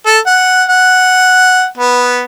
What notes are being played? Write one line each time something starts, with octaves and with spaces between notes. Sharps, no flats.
A4
F#5
F#5
B3